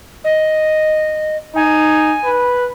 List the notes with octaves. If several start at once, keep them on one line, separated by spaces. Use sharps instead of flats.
D#5
D#4 G#5
B4